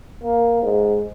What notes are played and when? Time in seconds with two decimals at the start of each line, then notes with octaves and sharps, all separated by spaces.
0.23 A#3
0.62 G#2